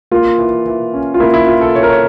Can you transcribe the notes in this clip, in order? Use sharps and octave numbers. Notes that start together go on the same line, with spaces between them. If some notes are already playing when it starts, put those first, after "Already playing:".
A#3 F4
E3
E3
C#4
F4
A#3 E4
E4
E3 F4
A4
E3 C#5
A#4
C#5